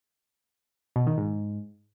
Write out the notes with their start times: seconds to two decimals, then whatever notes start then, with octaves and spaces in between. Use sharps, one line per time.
0.96 B2
1.07 D#3
1.17 G#2